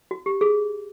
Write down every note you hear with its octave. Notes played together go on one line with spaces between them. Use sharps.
F#4
G4
G#4